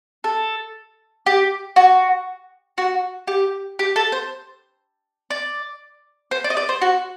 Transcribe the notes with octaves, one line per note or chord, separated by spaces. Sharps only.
A4
G4
F#4
F#4
G4
G4
A4
C5
D5
C5
D5
D#5
D5
C5
F#4